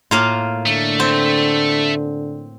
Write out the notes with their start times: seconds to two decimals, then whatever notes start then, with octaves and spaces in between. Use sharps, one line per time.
0.11 A2 A#3 F4
0.66 D3 A3
1.00 C4